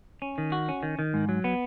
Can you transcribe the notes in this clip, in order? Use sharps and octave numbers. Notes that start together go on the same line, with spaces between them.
C#4
D#3
F#4
C#4
D#3
D#3
G#2
F#3
B3